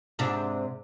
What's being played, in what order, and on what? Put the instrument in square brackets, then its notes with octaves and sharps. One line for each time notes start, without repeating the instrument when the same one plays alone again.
[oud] G#2 C3 D4